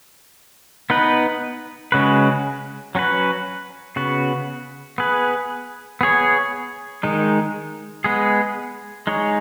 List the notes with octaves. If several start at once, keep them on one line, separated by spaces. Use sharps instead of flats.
B3 D#4 B4
C#3 G#3 C#4 F#4 B4
F#3 C#4 F#4 B4
C#3 B3 F#4
B3 G#4 B4
B3 G#4 C#5
D#3 G#3 D#4
G#3 B3 G#4
G#3 D#4 G#4 C#5